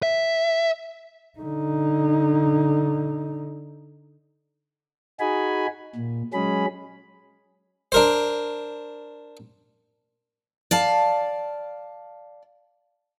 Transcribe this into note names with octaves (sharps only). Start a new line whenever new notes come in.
E5
D3 D#4
D#4 F#4 G#4 G#5 B5
A#2
F#3 G#3 C#4 G#4 B5
D4 A#4 C5
D5 F5 A5